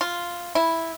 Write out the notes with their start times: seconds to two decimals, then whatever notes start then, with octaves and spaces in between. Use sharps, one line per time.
0.01 F4
0.55 E4